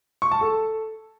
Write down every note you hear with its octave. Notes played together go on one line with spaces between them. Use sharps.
C#6
A5
A4